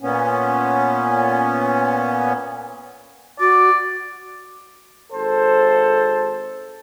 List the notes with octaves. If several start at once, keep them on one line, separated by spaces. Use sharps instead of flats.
A#2 B3 C#4
F#4 D5
G#1 A4 C5